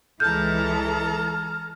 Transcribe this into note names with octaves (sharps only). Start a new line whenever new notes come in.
C#2 E3 G#3 A4 A5 A#5 F6 G6